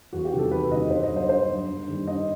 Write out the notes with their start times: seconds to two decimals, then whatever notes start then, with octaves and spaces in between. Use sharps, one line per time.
0.13 E2 F#4
0.25 G4
0.32 C3 D#3 G3
0.39 A4
0.51 E2 B4
0.71 C3 D#3 G3 D#5
0.90 G2 C5
1.03 D#5
1.10 F#3
1.16 C5
1.29 G2 C5
1.49 F#3
1.68 G2
1.88 D#3 G3
2.07 G2 D#5